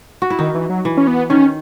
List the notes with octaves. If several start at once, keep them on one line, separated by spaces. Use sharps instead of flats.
F#4
E4
D#3 D#4
E3
F#3
E3
C#4
B3
D#3 C#4